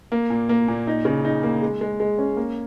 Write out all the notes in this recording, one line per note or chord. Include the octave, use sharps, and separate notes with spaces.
A#3
A#2
A#3
A#2
D#4
C#3
D#4
A#3
G#3
G#3
G#3
C#4
A#3